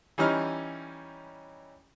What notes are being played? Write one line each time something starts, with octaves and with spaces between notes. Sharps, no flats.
E3 G3 C#4 D#4 F6